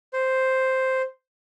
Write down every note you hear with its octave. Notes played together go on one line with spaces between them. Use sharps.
C5